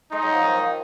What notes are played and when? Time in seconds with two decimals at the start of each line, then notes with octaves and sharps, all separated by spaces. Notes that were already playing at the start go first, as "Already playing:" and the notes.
0.12 G#3 D#4
0.22 F#3
0.32 F3
0.43 D#3
0.58 F3